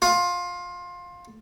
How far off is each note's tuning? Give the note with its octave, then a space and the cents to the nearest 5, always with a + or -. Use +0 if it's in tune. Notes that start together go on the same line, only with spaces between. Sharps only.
F4 +20